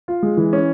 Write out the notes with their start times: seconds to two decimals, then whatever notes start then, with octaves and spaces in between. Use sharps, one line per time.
0.08 F4
0.23 G#3
0.37 E3
0.53 C#4